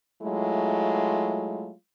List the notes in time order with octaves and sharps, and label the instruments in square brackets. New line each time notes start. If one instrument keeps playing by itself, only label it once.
[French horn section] F#3 G#3 A3 E4 F4